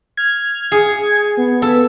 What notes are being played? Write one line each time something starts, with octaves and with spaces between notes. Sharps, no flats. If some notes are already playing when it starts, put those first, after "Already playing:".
F6 G#6
G#4 C#7
B3
A4 B4